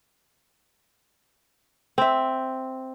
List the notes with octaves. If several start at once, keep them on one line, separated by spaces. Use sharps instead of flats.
C4 E5